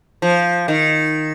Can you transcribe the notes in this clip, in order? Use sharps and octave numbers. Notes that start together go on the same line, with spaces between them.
F3
D#3